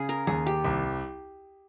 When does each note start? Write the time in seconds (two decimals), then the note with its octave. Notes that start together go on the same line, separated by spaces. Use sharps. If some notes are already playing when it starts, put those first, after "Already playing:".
Already playing: C#3 G#4
0.09 A#4
0.27 D#2 G#4
0.46 G4
0.64 C2